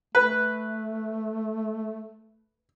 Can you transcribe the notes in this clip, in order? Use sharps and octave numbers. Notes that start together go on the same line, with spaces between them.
A3 B4